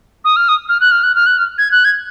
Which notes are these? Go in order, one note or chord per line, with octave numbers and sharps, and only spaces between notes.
D#6
F6
D#6
F6
F#6
F6
F#6
F6
F#6
F6
G#6
F#6
G#6